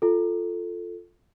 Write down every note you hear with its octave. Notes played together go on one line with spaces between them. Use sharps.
F4 A4